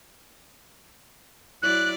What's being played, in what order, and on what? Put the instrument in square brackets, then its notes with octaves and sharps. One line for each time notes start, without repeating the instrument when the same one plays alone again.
[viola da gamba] F#3 E4 D5 [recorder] F#6